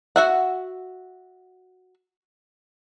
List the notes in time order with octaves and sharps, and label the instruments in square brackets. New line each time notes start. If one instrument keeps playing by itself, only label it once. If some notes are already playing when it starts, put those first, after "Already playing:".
[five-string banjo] F#4 E5 F#5